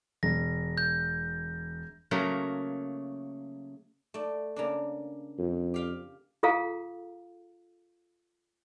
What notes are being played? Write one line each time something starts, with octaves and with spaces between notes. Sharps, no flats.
E1 A#6
G6
C#3 F#3 A3 A#3
A3 D5
C#3 A#3 D4
F2
G4 F5 G5
F4 G#4 A4 F5 A#5